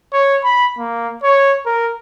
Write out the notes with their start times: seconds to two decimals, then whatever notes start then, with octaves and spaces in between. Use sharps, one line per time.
0.13 C#5
0.44 B5
0.79 A#3
1.23 C#5
1.66 A#4